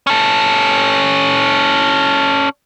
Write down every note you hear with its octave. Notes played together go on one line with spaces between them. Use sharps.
C#4 A4